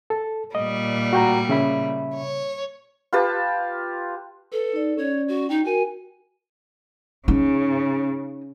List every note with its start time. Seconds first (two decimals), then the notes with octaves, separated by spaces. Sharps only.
0.10 A4
0.55 A#2 G3 D#5
1.13 F#4 G5 A#5
1.49 C#3 E5 B5
2.14 C#5
3.13 F4 G4 B4 A5
4.52 A4 B4
4.73 D#4 D5
4.97 C#4 C#5 D5
5.28 F#4
5.49 D#4 G5
5.64 F#4 A#4 G#5
7.28 C#3 C#4 D#4